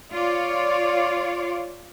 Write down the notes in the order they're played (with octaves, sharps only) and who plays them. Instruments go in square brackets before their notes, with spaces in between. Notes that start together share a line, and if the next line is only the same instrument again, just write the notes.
[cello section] F4 C#5 D5